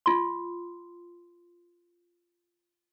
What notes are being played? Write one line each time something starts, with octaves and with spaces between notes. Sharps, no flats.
F4 C6